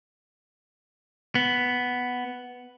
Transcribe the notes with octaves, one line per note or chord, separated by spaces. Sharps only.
B3